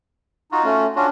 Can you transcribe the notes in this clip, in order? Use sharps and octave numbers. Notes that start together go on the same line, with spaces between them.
D#4 F4 F#4
A3 C#4
C#4 D4 F4 F#4